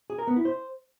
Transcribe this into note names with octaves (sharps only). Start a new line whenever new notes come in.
G#4
A#4
B3
E4
C5